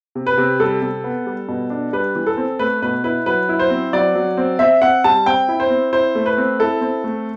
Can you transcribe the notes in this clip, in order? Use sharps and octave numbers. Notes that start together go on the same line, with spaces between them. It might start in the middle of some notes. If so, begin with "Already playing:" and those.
C3
B4
C3
G3 A4
C3
B3
G3
B2
D4
G3 B4
E3
A4
C4
A3 B4
B2 B4
E4 B4
F#3 B4
E4
C5
C4
F#3 D5
F#3
C4
C4 E5
C4 F#5
G3 A5
C4 G5
E4
C5
C4
E4 C5
A3
B4
C4
E4 A4
C4
A3